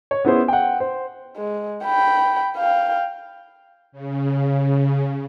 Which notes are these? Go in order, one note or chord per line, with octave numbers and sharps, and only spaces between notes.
C#5
B3 C#4 E4 G#4 C5
F#5 G5
C5
G#3
G5 B5
F5 G5
C#3